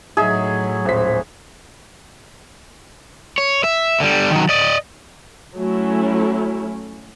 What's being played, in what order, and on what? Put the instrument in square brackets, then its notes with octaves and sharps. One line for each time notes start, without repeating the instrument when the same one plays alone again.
[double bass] A2 F#3 [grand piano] D#4 E5 [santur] G#4
[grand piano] D#1 B6 [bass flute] C5
[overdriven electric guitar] C#5
E5
D3 G3
D#3 F#3
D5 D#5
[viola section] F#3 A3 C#4 E4